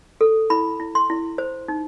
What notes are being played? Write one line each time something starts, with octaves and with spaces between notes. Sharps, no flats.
A4
E4 B5
E4
C6
E4
C5
D#4